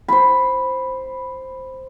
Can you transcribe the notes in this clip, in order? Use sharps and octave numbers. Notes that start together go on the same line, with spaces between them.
C5 B5